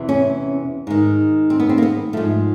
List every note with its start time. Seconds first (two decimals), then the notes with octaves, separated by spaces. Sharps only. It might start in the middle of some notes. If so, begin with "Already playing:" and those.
Already playing: E2 C3 E3
0.09 C#4
0.87 G#2 D#3
1.50 C4
1.60 B3
1.69 C4
1.78 A#3
1.83 B3
2.13 G#2 F3 A3